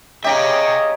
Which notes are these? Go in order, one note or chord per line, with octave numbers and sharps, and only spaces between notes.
C#3 G4 C#5 D#5 E5 G5 A#5